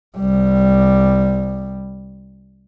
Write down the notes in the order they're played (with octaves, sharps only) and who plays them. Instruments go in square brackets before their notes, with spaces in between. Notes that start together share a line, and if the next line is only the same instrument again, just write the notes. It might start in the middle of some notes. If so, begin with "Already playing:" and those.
[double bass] C2 G3